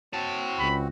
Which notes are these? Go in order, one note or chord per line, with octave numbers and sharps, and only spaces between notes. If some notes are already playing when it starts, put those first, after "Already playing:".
C4 F#4 C#5 A5
C#2 B5